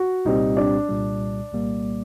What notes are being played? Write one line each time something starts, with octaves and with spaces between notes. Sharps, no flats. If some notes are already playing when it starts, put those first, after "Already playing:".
Already playing: F#4
C2 A#2 G3 C4 D#4 G4
D4
C2 A#2 G3
C2 A#2 G3 A#3